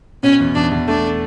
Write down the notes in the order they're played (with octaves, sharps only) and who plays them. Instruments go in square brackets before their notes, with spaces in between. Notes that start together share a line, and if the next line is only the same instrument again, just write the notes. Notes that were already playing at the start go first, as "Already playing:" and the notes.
[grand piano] B2 [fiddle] C#4
[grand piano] E2
[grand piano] E2 [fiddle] D4
[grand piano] E2
[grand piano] A3 [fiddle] D4